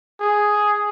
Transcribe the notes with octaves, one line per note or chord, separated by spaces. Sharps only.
G#4